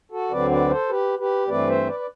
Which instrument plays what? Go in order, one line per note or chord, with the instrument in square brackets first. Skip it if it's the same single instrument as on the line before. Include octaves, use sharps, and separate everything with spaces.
[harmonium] F#4 A4
D2 D3 F#3 C4 B4 D5
B4 D5
A4 C5
G4 B4
G4 B4
G2 E3 A3 C4 B4 D5
C5 E5
B4 D5
D5